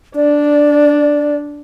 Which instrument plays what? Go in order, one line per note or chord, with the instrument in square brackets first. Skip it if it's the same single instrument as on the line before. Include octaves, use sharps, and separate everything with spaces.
[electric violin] D4 [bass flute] D5